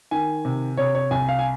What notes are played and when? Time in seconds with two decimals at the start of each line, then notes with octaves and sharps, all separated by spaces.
0.11 D#3 G#5
0.45 C3
0.77 C3 C#5
0.95 C#5
1.11 C2 G#5
1.29 F5
1.39 G#5